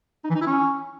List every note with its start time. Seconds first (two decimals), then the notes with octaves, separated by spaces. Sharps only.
0.24 D#4
0.30 E3
0.35 D#4
0.41 E4
0.46 C#4